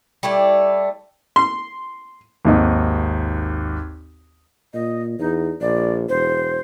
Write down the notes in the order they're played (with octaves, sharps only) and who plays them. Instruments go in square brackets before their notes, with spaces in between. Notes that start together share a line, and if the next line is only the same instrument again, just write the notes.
[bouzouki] G3 A3 E4 D5
[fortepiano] C6
[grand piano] G#1 D#2 D#5
[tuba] A#2 [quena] D#5
[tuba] E2 [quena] D#4
[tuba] A#1 [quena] D5
[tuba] E1 [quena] C5